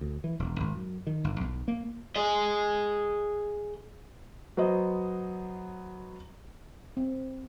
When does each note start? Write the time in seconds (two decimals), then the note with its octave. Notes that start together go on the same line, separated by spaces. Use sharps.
0.01 D2
0.24 E3
0.39 E1
0.60 G#1
0.75 F#2
1.07 D#3
1.24 G1
1.40 B1
1.68 A#3
2.16 G#4 D#5
4.57 F#3 B3 C5 D#5
6.97 C4